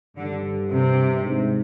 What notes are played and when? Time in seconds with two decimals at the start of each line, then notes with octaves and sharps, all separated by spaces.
0.17 G2 D3
0.71 C3
1.24 G#2